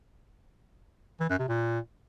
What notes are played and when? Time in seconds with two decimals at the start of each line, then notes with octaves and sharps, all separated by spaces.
1.20 E3
1.29 F#2
1.39 C3
1.48 A#2